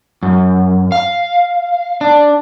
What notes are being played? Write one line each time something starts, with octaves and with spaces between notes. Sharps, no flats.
F#2
F5
D4